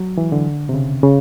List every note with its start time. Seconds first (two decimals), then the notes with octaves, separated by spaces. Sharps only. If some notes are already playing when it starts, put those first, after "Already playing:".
Already playing: F#3
0.17 E3
0.32 D3
0.69 C3
0.74 C#3
1.03 C#3